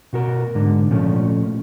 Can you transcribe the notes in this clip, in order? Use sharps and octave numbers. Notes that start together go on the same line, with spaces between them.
B2 F#4 A#4
G#2 D3
A#2 F3 A3 C#4